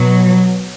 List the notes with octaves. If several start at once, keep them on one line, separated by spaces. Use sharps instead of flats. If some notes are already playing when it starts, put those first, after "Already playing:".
Already playing: B2 F#3